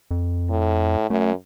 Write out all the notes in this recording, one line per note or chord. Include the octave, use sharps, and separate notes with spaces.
F2
A2
F#2 A3